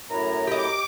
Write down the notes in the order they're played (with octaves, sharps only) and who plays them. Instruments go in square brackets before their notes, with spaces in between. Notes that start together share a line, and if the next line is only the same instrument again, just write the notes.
[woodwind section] F#2 A#5 [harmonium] A2 E4
[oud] G4 D#5 [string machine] D6